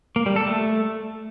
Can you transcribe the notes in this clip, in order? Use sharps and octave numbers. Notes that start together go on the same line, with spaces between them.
A#3
G3
A4
A3